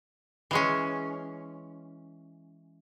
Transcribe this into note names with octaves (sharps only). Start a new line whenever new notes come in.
E3 G#3 C#4